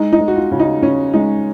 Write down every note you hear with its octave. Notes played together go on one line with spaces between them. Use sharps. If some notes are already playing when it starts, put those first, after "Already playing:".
Already playing: G#3 D#4
D#4
G#3
F#4
F4
C#3
D#4
C#3 C#4
G#3 D#4